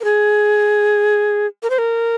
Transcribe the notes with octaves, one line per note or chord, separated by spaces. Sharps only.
A#4
G#4
A#4
C5
A#4